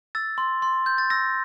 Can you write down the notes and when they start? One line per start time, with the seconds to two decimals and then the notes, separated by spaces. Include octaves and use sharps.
0.15 E6 A6
0.38 C6
0.62 C6
0.86 G6
0.98 A6
1.10 E6 A#6